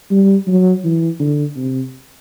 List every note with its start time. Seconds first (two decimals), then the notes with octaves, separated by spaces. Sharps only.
0.10 G3
0.47 F#3
0.84 E3
1.19 D3
1.56 C3